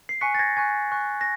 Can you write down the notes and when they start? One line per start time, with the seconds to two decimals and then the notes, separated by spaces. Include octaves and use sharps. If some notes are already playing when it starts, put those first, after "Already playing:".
0.09 C7
0.21 G#5 C#6 F#6 B6 C#7
0.34 A6
0.39 G#6 A#6
0.57 G#5 C#6 F#6 G#6
0.92 G#5 C#6 F#6
1.21 A#6